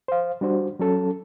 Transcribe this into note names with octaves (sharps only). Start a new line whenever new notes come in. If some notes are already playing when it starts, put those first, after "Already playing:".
C5 F5
G3 D4 F#4 C5
F#3 C#4 A4